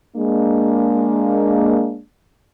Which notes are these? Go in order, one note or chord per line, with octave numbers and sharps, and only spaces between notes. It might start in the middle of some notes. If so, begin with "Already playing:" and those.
G#3 A#3 D4